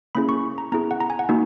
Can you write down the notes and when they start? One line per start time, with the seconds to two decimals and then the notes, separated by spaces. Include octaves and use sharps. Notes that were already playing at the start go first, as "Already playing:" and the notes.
0.15 A#3 C#4 E4 G#4 B5
0.29 C#6
0.58 A#5
0.72 B3 E4 G#4 A#5
0.91 F#5
1.00 A#5
1.10 G#5
1.19 F#5
1.29 A#3 D#4 F#4